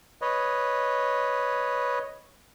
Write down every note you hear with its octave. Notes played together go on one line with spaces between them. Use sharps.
B4 C#5 D#5